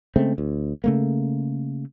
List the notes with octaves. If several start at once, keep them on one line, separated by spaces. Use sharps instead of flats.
C#3 G#3 A3 C4
D2
C#3 A3 A#3